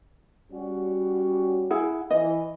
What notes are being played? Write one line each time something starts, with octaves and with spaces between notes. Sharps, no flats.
G3 C#4 F#4
E4 G#4 F#5
E3 D#5